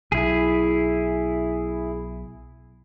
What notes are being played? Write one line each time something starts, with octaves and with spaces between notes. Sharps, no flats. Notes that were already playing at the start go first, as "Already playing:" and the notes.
B1 E4 G#4